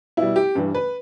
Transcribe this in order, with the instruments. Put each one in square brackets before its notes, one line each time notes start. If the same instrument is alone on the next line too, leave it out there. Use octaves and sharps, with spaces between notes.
[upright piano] B2 G3 E4
G4
G2 E3 G3
B4